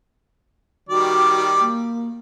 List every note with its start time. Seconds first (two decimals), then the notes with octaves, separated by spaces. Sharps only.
0.89 D#3 G3 F#4 D5
1.60 A#3